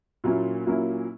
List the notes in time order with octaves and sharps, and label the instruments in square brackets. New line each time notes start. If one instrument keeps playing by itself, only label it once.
[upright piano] A#2 F#3 A#3 C#4 E4
A#2 F#3 A#3 C#4 E4